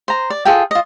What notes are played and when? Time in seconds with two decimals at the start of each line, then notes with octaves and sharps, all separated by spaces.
0.08 C5 A#5
0.30 D5
0.45 F4 G#4 A4 G5
0.71 F4 D#5